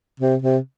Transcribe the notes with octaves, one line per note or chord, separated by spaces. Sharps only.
C3
C3